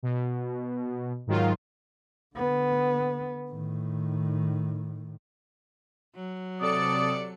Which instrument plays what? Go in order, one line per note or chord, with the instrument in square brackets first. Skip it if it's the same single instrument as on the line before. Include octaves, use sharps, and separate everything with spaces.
[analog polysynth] B2
G#2 D#3 F#3 F4
[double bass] D3 B3
A2 D#3
[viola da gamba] F#3
[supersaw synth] C3 A4 C#7 [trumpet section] D5 [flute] D#6